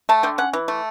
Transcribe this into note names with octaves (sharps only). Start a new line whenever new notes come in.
A3 A5
D3 G5
C#4 F#5
E3
A3